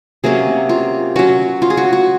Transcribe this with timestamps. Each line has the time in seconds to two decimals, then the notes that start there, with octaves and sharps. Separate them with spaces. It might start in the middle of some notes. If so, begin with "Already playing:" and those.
0.24 C3 F#3 A#3 C#4 G#4
0.69 F4
1.16 F#3 C#4 F#4
1.62 F4
1.70 G#4
1.77 F#4
1.93 F#4